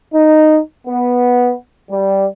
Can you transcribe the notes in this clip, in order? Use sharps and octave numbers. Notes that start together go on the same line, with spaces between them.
D#4
B3
G3